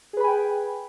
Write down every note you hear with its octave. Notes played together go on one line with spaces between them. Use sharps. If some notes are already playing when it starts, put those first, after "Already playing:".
G#4 B4 G5 G#5 B5